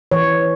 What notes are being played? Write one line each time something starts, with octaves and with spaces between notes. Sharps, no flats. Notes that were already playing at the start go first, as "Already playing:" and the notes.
E3 C#5